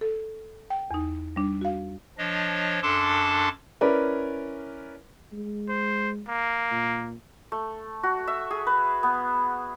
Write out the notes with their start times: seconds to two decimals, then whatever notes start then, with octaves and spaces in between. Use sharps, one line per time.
0.01 A4
0.70 G5
0.91 E2 D#4
1.36 G3 D4
1.61 F#4 F5
2.18 F3 D4 C#5 D#5
2.82 F#2 D4 A4 A5 C6 D6
3.81 C#4 E4 A#4 B4 D5
5.33 G#3
5.69 C5
6.28 A#3
6.71 A#2
7.52 A3
8.03 F#4
8.27 E5
8.51 G#4
8.67 B4
9.03 B3